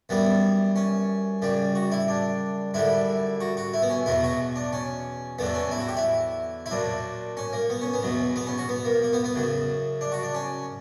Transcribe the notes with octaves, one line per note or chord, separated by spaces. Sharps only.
F#2 E3 G3 B3
C#4
F#2 C#3 G3
F#4
E4
D4
F#2 D3 G3 E4
F#4
F#4
E4
B3
C#4
E2 B2 F#3 E4
F#4
D4
C#4
E2 D3 F#3 B3
C#4
E4
F#4
G4
E4
E4
A#2 F#3 D4
C#4
A#3
B3
C#4
B3
E2 B2 F#3
B3
C#4
F#4
B3
A#3
A#3
B3
B3
F#2 C#3 F#3
D4
F#4
D4
C#4